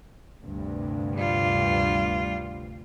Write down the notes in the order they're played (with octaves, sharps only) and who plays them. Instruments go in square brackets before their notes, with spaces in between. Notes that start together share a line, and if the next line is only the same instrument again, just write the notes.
[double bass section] D2 G2 C3
[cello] G3 F4